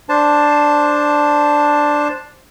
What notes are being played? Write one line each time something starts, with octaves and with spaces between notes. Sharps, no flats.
D4 C5 A5